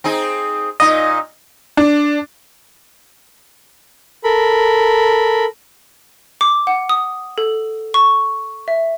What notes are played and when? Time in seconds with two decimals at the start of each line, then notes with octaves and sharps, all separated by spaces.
0.04 C4 D#4 G#4
0.80 A#2 D#4 D#5
1.77 D4
4.24 A4 A#4 B5
6.41 D6
6.67 F#5
6.89 D#6
7.38 A4
7.94 C#6
8.68 E5